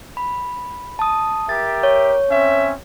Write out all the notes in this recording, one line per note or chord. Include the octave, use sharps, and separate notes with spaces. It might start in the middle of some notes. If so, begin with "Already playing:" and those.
B5
A5 D#6
G4 A#4 E5 A6
C#5
C4 C#4 E5